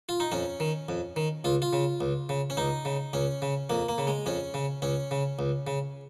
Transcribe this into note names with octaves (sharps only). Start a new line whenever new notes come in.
F4
D#4
F2 C#4
D#3
F2
D#3
C#2 F4
F4
C#3
C#2
C#3
C#4
C#2 D#4
C#3
C#2 C#4
C#3
F2 A#3
A#3
C#3
G#3
F2 C#4
C#3
C#2 C#4
C#3
C#2
C#3